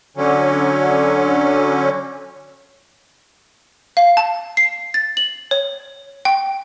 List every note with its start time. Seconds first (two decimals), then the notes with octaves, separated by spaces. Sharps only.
0.17 D3 F#3 C#4
3.97 F5
4.17 A5
4.57 C7
4.94 A6
5.17 F#7
5.51 C#5
6.25 G5